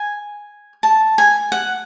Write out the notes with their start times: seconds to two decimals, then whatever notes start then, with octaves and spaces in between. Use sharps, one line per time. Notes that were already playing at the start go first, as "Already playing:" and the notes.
Already playing: G#5
0.83 A5
1.18 G#5
1.52 F#5